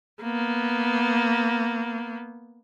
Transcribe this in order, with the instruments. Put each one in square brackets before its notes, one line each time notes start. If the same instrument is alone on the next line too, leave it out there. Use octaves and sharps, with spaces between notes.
[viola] A#3 B3